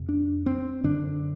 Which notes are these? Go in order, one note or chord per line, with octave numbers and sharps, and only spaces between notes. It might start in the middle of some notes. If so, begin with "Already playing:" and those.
Already playing: F2 C3
D4
C4
F#2 D3 D4